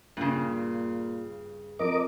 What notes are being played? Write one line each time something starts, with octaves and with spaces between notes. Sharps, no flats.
G2 A#2 C#3
F2 A#4 D#5 D6